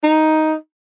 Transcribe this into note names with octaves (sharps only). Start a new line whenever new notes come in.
D#4